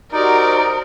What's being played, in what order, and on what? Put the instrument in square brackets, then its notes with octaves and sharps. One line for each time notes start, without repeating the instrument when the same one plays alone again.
[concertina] D#4 [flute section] F#4 G4 C5 [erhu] A#4 [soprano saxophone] D5